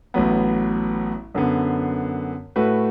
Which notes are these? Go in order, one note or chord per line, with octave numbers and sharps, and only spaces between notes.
A1 A2 F#3 B3
F#2 D3 B3
A2 A3 F#4 B4